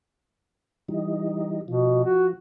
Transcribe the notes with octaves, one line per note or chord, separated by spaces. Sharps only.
E3 G3 D#4
B2 F3
F#4